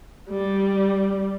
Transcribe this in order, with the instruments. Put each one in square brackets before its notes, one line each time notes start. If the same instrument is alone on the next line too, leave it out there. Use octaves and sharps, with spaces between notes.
[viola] G3